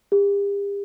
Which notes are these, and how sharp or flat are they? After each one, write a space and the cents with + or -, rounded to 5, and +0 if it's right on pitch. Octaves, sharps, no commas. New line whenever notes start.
G4 +40